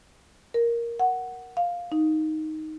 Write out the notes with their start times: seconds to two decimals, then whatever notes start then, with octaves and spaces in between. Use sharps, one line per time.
0.54 A#4
0.99 F#5
1.57 F5
1.92 D#4